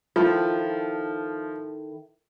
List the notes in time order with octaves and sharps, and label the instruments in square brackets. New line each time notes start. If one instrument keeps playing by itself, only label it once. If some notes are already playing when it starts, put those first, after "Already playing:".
[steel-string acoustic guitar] D#3 E4 A4 [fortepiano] F3 [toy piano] F4